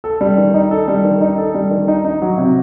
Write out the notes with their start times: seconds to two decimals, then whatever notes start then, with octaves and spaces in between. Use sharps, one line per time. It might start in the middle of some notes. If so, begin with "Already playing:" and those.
0.04 A4
0.21 G3
0.38 D#3
0.54 D#4
0.71 A4
0.88 G3
1.05 D#3
1.21 D#4
1.38 A4
1.54 G3
1.71 D#3
1.88 D#4
2.05 D#4
2.22 F#3
2.38 C3